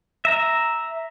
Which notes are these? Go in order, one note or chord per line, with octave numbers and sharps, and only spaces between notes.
E5 A#5